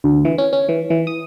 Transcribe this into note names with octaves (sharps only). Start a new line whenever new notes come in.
D2
E3
C#4
C#4
E3
E3
D#6